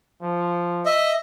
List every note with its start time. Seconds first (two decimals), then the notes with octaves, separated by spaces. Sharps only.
0.22 F3
0.86 D#5 E5